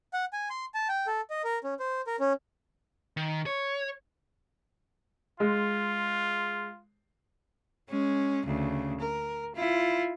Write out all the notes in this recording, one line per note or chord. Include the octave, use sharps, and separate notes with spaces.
F#5
G#5
C6
A5
G5
A4
D#5
A#4
C#4
C5
A#4
C#4
D#3
C#5
G#3 F4
G#3 C#4
D2 C#3
A#4
E4 F4